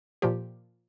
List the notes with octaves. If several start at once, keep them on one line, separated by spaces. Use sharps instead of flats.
A#2 F3 G4